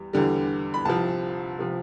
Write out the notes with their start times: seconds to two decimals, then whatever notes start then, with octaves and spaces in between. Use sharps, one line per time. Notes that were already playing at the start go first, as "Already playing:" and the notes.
Already playing: E2 G3
0.13 E2 D3 G3
0.74 B5
0.85 C2 C3 F3 A5
1.59 C3 F3